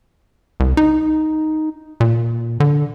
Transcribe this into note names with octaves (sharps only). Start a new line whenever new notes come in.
C2
D#4
A#2
D3